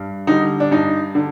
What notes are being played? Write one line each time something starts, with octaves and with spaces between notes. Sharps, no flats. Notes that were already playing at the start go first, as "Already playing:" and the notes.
Already playing: G2
D3 G3 D#4
D4
G2 D#4
D3